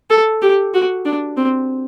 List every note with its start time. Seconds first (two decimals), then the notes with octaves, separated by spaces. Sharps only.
0.10 A4
0.42 G4
0.74 F#4
1.06 D4
1.37 C4